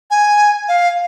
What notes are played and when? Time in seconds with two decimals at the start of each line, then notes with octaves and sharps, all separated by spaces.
0.10 G#5
0.68 F5